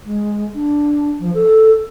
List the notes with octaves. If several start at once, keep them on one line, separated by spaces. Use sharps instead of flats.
G#3
D4
F3
A4